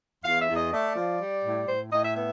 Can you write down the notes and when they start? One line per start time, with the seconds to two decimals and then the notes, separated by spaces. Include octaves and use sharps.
0.24 E2 F5
0.41 E5
0.49 E2
0.56 D#5
0.72 A3 D5
0.96 F3
1.20 G3
1.45 A2
1.68 A2 C5
1.92 A2 D#5
2.04 E5
2.17 B3 E5